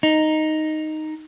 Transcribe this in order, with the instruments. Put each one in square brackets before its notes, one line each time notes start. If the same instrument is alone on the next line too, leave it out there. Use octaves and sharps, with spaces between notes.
[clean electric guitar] D#4